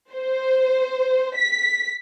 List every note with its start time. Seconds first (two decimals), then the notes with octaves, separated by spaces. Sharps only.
0.13 C5
1.36 B6